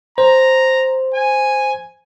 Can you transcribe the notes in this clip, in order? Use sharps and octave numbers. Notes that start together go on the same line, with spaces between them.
C5 A#5
G#5